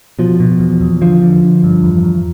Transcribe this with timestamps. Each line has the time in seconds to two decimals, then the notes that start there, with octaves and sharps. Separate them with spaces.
0.19 B2 F3
0.40 B2
0.60 E2
0.81 E2
1.01 D3 F3
1.22 D3
1.43 D3
1.64 G2
1.83 E2
2.04 E2